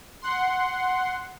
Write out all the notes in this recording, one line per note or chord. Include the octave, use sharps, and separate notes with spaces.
F#5 C6